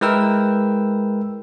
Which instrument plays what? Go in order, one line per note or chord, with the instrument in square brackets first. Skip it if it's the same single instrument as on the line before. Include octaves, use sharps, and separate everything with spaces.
[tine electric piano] G#3 E4 A#4 B4 G5 E6